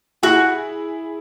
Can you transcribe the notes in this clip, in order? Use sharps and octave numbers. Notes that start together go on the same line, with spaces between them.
E4 F#4 G#4